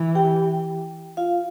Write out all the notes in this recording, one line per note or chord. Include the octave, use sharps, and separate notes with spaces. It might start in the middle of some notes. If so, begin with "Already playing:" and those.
Already playing: E3
G4 G5
F4 F5